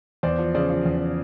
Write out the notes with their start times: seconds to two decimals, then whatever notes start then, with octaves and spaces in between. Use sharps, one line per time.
0.23 E2 C5 D5
0.38 F3
0.55 C#3 C5 D5
0.70 F3
0.86 E2